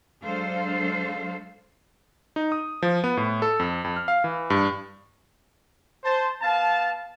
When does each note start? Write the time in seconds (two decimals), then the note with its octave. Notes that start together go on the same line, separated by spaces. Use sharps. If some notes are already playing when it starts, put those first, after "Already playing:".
0.24 F#3 G#3 D4 A4 C5 F5
2.36 D#4
2.52 D#6
2.82 F3
3.04 B3
3.17 A2
3.42 A4
3.59 F2
3.84 F2
3.96 F6
4.08 F5
4.24 E3
4.50 G2
6.04 C5 A5
6.41 B3 F5 A5